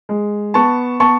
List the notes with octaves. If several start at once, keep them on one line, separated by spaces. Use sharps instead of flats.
G#3
B3 A5 C#6
B3 A5 C#6